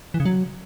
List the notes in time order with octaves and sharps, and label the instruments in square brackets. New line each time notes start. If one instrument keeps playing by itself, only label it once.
[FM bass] E3
C#3
F#3